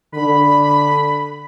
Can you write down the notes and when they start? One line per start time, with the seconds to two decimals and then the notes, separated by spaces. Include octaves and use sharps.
0.14 D3 B5